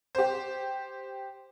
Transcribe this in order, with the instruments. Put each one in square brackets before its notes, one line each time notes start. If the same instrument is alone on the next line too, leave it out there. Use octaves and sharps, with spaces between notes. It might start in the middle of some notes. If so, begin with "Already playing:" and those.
[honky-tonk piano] G4 C5